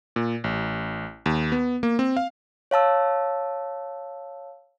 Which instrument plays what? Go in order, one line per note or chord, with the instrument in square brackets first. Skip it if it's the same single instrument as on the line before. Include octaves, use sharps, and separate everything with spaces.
[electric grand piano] A#2
A1
D#2
B3
A#3
C4
F5
[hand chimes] C#5 F5 A5 E6